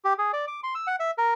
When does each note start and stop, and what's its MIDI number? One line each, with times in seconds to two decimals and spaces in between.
0.05 0.13 67
0.18 0.32 68
0.33 0.45 74
0.47 0.60 86
0.63 0.74 84
0.75 0.87 88
0.87 0.96 78
1.00 1.11 76
1.18 1.34 70